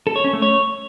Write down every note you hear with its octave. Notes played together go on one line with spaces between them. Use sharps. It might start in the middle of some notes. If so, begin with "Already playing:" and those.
A4
C#5
C#4
A3
C#5